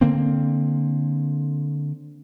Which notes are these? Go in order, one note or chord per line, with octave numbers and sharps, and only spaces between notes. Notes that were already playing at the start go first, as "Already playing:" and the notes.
D3 A#3 C4